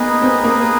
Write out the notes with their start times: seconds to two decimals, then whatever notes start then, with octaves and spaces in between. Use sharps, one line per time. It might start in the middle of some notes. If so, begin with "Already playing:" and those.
Already playing: A#3 B3 D#4 G#4 B4 D#5
0.22 C4
0.44 A#3